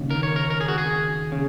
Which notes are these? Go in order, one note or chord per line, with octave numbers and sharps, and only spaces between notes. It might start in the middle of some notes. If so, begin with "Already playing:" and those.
Already playing: D#2 C#3
A#4
C#5
A#4
A#4
G#4
F#4
G#4
C#3